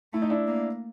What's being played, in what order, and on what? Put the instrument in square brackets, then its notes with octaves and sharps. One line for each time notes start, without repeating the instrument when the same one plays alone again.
[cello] A3 [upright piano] E4
[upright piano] D#4
D4 E4
[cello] A#3